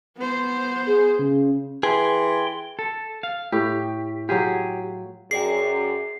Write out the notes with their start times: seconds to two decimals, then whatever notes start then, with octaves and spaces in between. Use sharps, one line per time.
0.17 B3 C5
0.86 G#4
1.19 C#3
1.83 E3 G#4 G5 C6
2.79 A4
3.23 F5
3.52 A2 G4
4.29 F#3 F4 G4 G#4
5.31 F#2 G#4 D5 G5 C7